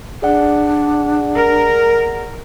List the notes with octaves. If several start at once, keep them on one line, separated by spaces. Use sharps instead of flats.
D4 G#4 D5 F#5
A#4